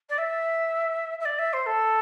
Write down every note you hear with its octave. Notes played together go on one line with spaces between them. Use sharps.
D5
E5
E5
D5
E5
C5
A4